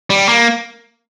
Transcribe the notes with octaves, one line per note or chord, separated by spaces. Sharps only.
G3
A#3